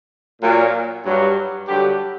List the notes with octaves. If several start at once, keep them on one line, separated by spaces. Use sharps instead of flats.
A#2 F#3
G2 F#3
G2 D3 F#3 G4